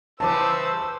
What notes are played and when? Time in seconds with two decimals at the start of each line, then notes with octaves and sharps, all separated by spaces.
0.20 C#3 E3 G3 B4 C5 A5 D6 E6